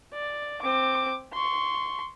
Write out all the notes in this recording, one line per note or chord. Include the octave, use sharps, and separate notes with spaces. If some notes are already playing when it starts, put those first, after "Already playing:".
D5
C4 D6
C6 C#6